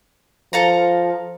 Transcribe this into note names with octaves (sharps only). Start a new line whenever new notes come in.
F3 A4 F5 A#5